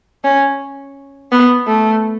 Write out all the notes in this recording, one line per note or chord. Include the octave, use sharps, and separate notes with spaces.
C#4
B3
A3